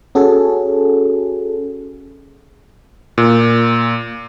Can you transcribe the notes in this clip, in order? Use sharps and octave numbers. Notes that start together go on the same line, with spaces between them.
C#4 F#4 G#4 A4
A#2